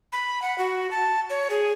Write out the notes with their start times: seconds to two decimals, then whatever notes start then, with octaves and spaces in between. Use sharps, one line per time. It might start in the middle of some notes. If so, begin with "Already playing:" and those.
0.12 B5
0.42 F#5
0.58 F#4
0.91 A5
1.30 C#5
1.50 G#4